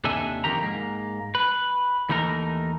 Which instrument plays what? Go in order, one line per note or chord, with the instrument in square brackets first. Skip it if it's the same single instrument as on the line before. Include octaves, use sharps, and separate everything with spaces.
[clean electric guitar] D#2 C3 D4 A4 E5 G#5
F2 C3 D#3 A#3 G4 A#5
G#2 A#3
B4
D#2 E3 A3 D#4 A#4